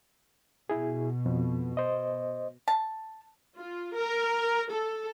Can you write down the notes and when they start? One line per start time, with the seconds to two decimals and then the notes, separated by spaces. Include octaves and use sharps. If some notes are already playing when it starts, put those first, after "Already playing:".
0.70 B2 E4 G#4
1.26 F2
1.77 C5 D#5
2.68 A5
3.56 F4
3.95 A#4
4.71 A4